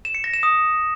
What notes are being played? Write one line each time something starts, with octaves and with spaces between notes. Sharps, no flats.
E7
C#7
A#6
E7
D#6